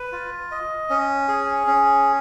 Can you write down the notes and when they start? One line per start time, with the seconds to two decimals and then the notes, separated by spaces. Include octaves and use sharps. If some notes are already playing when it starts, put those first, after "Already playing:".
Already playing: B4
0.12 F4
0.51 D#5
0.90 C#4
1.28 G#4
1.67 C#4